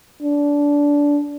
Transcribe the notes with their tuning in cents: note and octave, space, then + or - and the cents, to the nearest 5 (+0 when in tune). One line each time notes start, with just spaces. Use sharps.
D4 -20